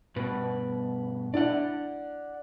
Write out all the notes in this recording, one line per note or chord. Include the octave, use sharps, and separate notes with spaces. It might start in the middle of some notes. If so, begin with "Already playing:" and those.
G2 B2 B4
D4 E4 D5 F#5